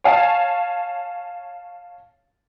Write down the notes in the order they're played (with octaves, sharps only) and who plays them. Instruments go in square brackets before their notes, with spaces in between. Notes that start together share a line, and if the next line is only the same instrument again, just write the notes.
[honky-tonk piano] C#5 F5 G#5 A5